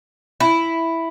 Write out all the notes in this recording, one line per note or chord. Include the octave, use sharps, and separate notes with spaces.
E4